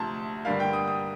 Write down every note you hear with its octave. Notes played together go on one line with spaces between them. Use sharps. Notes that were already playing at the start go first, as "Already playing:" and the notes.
Already playing: D2 C3 F3 A5 A#5 C6
G2 D3 G3 A#3 F5
G5
D#6
D#6